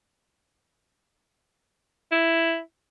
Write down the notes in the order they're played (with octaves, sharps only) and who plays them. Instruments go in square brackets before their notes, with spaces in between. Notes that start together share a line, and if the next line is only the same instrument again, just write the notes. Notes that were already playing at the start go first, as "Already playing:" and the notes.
[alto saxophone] E4